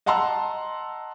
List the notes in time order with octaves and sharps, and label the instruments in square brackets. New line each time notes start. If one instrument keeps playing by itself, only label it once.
[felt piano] D#5 F#5 A5 A#5 C6 E6